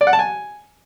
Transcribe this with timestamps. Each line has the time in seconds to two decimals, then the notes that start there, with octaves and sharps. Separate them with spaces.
0.01 D5
0.07 F#5
0.13 A5
0.19 G#5